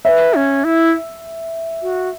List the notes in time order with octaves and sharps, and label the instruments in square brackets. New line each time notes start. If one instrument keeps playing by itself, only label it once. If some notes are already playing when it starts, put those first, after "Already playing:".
[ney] B4 C#5 [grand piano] E5
[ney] C#4
E4
F#4